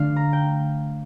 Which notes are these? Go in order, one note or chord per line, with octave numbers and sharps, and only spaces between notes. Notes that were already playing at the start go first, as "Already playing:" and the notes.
Already playing: D3 A3 D4 F5
A#5
G5